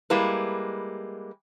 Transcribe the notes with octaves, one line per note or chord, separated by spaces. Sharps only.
G3 G#3 A#3 E4 B4